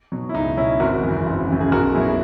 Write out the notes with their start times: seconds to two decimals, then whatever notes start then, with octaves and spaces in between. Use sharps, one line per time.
0.12 B2 F#3
0.29 E4
0.34 C#2 D#4
0.57 B2 F#3 C#4 E4
0.80 G#1 F#4 A#4
1.03 F#2 C#3 E3
1.26 G#1
1.49 F#2 C#3 E3
1.60 G#4
1.72 B1 F#4 A#4
1.95 B2 F#3 E4 G#4